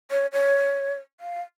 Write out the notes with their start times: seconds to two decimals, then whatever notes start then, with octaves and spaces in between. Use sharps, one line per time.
0.11 C#5
0.33 C#5
1.21 F5